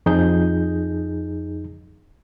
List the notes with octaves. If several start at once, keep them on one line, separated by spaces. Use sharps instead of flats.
F2 D#4 G#4 G6